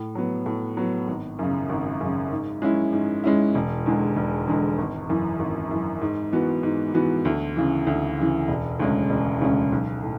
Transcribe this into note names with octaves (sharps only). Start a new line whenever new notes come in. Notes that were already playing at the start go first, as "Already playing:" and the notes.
Already playing: A2
F#3 B3
A2
F#3 B3
G#1
F#2 C#3
G#1
F#2 C#3
G#2
G#3 C#4 E4
G#2
G#3 C#4 E4
E1
E2 D3 G#3
E1
E2 D3 G#3
G#1
F#2 E3
G#1
F#2 E3
G#2
E3 B3 F#4
G#2
E3 B3 F#4
D2
C#3 E3
D2
C#3 E3
E1
D2 C#3 G#3 C#4
E1
D2 C#3 G#3 C#4
B1
A2